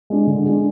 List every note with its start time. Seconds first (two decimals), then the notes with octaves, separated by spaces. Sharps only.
0.10 G#3 D4
0.27 D3
0.45 G#3 D4